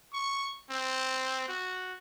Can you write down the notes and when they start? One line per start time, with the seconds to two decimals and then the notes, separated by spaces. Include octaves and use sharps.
0.13 C#6
0.71 C4
1.48 F#4